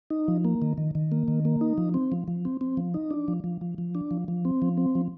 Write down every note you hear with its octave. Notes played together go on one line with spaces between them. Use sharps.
D#4
F3
A#3
D#3
D#3
D#3
A#3
D#3
A#3
D#4
F3
C4
F3
F3
C4
C4
F3
D#4
D4
F3
F3
F3
F3
D4
F3
F3
C4
F3
C4
F3